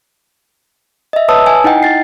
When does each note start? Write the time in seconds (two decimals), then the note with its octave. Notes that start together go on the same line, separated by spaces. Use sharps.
1.13 D#5 E5
1.28 B4 C#5 A5 D#6 E6
1.46 G#5
1.64 D#4 E4 D#5 F#5 G5
1.83 E4 A6 C7